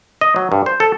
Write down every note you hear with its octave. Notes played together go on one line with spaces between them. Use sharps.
D#5
F#3
G2
C5
A4